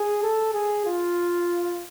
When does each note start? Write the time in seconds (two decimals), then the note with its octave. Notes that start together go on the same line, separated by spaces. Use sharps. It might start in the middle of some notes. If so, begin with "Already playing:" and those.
Already playing: G#4
0.23 A4
0.54 G#4
0.86 F4